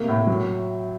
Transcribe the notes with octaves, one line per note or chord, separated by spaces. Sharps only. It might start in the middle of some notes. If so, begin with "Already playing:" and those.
Already playing: C3 A3 A#3
A2
F#3